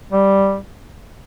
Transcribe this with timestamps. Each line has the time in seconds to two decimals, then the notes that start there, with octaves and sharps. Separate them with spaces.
0.12 G3